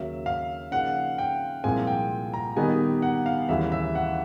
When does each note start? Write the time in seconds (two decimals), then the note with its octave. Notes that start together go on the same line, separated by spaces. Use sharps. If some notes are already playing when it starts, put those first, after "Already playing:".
Already playing: D#2 C#3 F#3 A#3 E5
0.26 F5
0.71 C#3 F3 A#3 D#4 F#5
1.18 G5
1.64 C2 A#2 F3 G#3 C4 G#5
1.87 G5
2.34 A#5
2.57 D#3 G3 B3 D#4 G4 G#5
3.02 F#5
3.26 F5
3.49 D#2 C#3 E3 G3 E5
3.72 E5
3.95 F#5